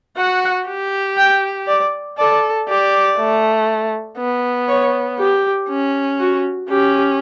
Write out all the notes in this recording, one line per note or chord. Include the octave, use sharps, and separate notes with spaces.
F#4 F#5
G4
G5
D5
A4 D5
G4 D5
A3
B3
C#5
G4
C#4
F#4
C#4 G4